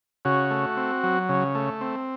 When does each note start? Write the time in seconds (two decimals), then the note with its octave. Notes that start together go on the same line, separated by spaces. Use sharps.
0.25 C#3 F#4
0.51 A3
0.77 C4
1.03 F#3
1.29 C#3
1.55 A3
1.81 C4